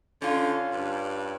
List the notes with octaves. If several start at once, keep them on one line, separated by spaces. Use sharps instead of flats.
D3 C#4 F4
G2